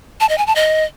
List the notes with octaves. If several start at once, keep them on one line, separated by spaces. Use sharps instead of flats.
A5
D#5
G#5
A5
D#5